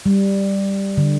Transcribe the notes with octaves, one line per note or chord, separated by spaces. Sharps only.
G3
D3